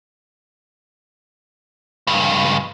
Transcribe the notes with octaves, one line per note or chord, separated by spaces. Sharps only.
C#2 G2